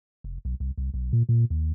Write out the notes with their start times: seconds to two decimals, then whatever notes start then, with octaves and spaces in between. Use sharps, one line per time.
0.24 F1
0.45 B1
0.60 C2
0.78 C2
0.94 B1
1.13 A#2
1.29 A#2
1.50 D#2